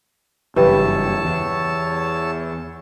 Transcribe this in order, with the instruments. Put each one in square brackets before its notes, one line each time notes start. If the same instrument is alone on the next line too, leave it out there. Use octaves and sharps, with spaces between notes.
[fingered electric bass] F#1 G2 [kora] E3 [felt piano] G4 [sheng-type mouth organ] C#5 A5 E6
[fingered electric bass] E2